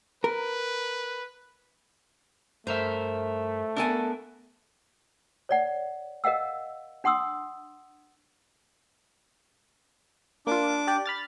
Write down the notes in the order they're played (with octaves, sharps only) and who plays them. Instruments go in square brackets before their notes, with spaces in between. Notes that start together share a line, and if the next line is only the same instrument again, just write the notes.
[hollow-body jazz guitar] A#4 [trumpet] B4
[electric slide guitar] G2 A#4 E5 [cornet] A3 [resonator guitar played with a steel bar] C5
[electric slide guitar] B3 A#4 [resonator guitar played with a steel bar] D4 A4 G#5
[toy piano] C#5 D5 F#5
A#4 D#5 F5 F#5 E6
D4 F#5 C6 D#6 E6
[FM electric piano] A#3 F4 [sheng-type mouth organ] D4 D6
[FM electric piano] G4 D5 G5
B5 F6 A6